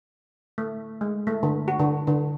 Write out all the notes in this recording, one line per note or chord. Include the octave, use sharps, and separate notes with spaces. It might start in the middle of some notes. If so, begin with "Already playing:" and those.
A3
G#3
A3
D3
F#4
D3
D3